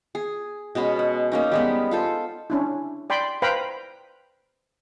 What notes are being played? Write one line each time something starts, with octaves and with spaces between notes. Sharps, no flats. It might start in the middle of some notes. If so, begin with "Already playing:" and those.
G#4
B2 G#3 B3 C#4
F#5
A#3 C#4 D#4
G3 G#3 B3
F4 A4 C5
C#4 D4 E4
D5 G5 B5 C6
B4 C5 F5 G5 A#5 B5